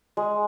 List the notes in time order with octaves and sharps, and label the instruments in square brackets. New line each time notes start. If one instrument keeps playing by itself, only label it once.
[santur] G#3